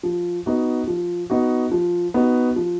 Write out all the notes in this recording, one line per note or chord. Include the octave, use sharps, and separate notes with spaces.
F3
B3 D#4 F#4
F3
B3 D#4 F#4
F3
B3 D#4 F#4
F3